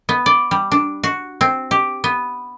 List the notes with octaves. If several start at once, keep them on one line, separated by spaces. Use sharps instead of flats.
B3
D5
G3
D4
F#4
C4
G4
B3